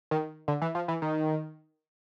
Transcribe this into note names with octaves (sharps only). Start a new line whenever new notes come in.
D#3
D3
E3
F3
E3
D#3